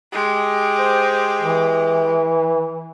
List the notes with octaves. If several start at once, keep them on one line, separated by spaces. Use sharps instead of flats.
G#3 G4
C5
E3